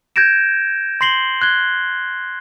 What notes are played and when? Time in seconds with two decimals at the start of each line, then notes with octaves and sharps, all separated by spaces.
0.16 G6 G#6 A#6 D7 E7
1.01 C6 A#6 C7 F#7 G7
1.42 F#6 G#6 G7